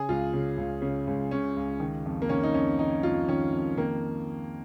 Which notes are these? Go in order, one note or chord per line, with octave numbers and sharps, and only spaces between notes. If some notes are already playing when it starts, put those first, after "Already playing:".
Already playing: C#3 G#4
C#2 F4
C#3
C#2
C#3
C#2
C#3 C#4
C#2
D#3
F2
A#3
D#3 C#4
D#4
F2 C#4
D#3 D#4
F2 F4
D#3 C#4
F2
D#3 A#3